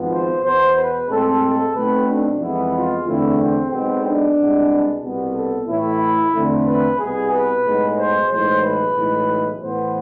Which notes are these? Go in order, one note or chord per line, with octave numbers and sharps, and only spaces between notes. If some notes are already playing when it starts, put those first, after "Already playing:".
Already playing: G#1 G#2 F3 B3
C5
E2 B2 B3 C5
B4
A2 G#3 C4 A4
A4
B1 B2 A3 C4 B4
D4
F2 E3 G#3 B3 E4
F4
E2 D3 A3 C4 E4
C4
B1 B2 G#3 B3 C4
D4
C2 B2 G#3 B3
C2 B2 B3
A4
A2 E3 A3 E4
E2 D3 A3 C4
B4
C2 B2 B3 G#4
B4
B1 A2 G#3 B3
C5
B1 A2 E3 G#3 C5
B4
B1 A2 E3 G#3
A2 E3 B3 C5